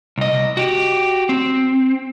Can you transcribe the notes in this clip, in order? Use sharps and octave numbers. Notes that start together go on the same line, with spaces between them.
C2 D#5
F#4 G4
C4